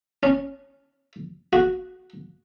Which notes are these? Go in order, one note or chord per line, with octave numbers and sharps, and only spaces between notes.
C#4
F#4